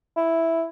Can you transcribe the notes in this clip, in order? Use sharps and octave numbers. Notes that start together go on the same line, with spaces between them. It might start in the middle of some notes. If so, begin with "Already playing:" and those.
E4